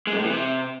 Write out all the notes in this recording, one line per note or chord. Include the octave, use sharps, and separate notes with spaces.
G#3
F#2
A2
E3
C3